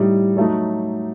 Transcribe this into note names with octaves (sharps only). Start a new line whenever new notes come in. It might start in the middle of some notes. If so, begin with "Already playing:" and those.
Already playing: A2 G3 D#4
F#3 A3 D#4